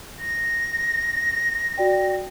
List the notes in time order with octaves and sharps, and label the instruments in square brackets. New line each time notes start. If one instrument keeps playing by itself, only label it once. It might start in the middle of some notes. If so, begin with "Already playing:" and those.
[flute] A#6
[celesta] F#4 D5 G5